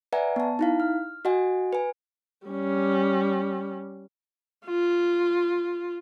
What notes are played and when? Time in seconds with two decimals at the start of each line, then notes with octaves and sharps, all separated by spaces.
0.13 B4 D5 E5 F#5 G#5 A#5
0.36 B3 A5
0.59 D#4 E4 F5
0.80 F6
1.25 F#4 D#5 F#5 G#5
1.73 B4 G#5
2.47 G3 C#4
4.66 F4